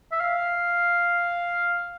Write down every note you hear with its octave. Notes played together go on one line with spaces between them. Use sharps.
E5
F5